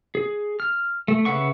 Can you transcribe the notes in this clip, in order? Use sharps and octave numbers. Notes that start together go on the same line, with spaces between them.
G#4
F6
A3
C#3 B4 E5 F#5 C#6